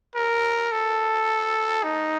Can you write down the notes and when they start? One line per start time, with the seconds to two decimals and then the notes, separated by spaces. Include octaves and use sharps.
0.16 A#4
0.72 A4
1.83 D#4